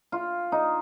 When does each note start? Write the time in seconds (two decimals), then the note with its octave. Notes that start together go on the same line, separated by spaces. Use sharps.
0.12 F4
0.52 D#4